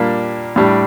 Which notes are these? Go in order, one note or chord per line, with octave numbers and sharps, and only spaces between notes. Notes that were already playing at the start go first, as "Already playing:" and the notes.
Already playing: A#2 G3 A#3 D4 G4
A2 G3 D4